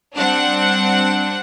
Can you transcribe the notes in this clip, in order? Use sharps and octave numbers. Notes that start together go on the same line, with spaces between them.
G3 C4 D4 F#5